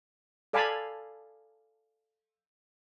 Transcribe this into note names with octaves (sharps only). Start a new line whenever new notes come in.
A4 D5 F5 G#5 A5 B5